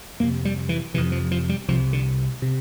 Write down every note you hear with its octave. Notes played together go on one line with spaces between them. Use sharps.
F2 C3 A#3
G3
E3
F2 C3 E3
F3
F3
G3
C2 C3 F3
D3
C3